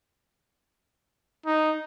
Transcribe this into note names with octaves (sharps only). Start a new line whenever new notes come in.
D#4